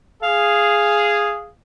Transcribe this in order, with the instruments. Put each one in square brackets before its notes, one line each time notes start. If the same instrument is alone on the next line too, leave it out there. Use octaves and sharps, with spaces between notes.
[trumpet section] G#4 [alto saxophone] F5